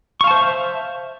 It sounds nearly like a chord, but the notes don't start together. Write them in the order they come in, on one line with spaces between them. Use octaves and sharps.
C#6 F5 A5 C5 E5